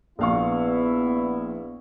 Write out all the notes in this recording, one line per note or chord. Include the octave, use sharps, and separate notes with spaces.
A#1 B3 E4 F5 C#6